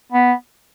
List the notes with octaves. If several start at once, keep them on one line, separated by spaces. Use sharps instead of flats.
B3